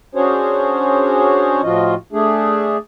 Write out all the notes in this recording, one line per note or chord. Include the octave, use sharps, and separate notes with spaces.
C#4 D4 F#4 G#4 C5 C#5
A2 F3 F4 F#4 D#5
A3 D4 G#4